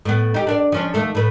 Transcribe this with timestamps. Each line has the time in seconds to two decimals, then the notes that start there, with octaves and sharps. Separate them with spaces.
0.05 A2 B3
0.34 D#4 G4
0.47 D4 A#4 D5
0.72 F3 C#4 D4
0.94 D#2 A3 A4
1.15 A2 B4